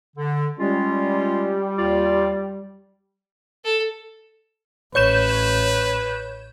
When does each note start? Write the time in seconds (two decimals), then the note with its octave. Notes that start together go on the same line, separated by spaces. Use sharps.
0.17 D3
0.59 G3 G#3 C#4 F4
1.77 D#2 F4 D5
3.64 A4
4.95 A1 B4 C#5 G6 E7